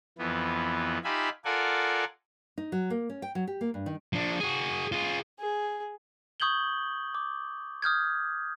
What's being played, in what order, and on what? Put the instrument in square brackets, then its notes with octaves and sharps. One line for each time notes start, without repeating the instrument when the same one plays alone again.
[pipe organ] F2 E3 B3
D#4 F4 G4 E5 G#5 B5
F4 A4 A#4 D5 F#5 G#5
[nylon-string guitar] D#4
F#3
A#3
C#4
G5
F#3
G4
A#3
G2
D#3
[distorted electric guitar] F3 D4
F#4 G#4
F4 G#4
[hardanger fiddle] G#4
[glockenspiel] C#6 D#6 G6 G#6 F#7 G7
D6
D#6 F6 G6 G#6